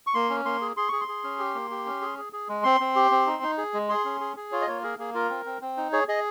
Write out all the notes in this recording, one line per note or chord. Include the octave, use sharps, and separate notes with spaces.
C#6
A#3 C6
C#4
A#3 C6
G#4
G#4 C6
G#4 C#6
C6
G#4
C#4
G4
A#3
G4
C#4
G#4
G#4
G#4
G#3
C4 C6
C4
G4
C4
D#4
D#4
G#4
G#3
G#4 C6
C#4
G#4
G#4
F4 C#5
D#5
A#3 C#5
G#4 A#4
A#3 G#4
F4 A#4
C4
C4
C4
D#4
G#4 C#5
G#4 D#5